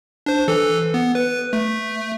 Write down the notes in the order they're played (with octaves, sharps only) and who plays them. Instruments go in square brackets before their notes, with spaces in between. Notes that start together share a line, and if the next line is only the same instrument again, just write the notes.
[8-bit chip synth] D4 C5
E3 A4
B3
B4
A3